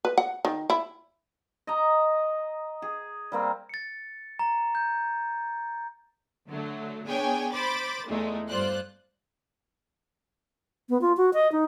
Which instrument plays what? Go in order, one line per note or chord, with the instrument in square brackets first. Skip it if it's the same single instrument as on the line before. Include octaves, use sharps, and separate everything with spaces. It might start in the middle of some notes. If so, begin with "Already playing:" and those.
[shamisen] B4
F#5
D#3
E4
[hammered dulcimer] D#5 A#5
G#4
G3 A#3 C4
[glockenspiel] A6 C#7
A#5
G6
[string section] D3 F#3 A3
B3 D4 G#4 C#5 G5 G#5
C5 B5 D6 A6
E2 A#2 G#3 A3 D#4
G2 F4 C5 D5 F#6
[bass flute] B3
F4
F#4
D#5
D#4